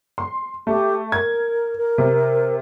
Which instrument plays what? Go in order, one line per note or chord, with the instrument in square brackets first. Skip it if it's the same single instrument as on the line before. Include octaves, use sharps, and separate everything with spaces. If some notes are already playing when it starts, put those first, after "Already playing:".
[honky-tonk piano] C6
[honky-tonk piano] A3 [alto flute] G4
[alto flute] A#4 [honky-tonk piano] G#6
[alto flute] A#4
[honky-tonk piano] C3